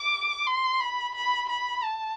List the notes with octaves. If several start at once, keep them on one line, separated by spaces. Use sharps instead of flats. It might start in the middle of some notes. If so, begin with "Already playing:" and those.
Already playing: D6
C6
B5
B5
B5
A5